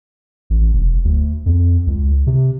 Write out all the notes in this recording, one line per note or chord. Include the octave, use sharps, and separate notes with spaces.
A1
E1
D2
F2
C#2
C3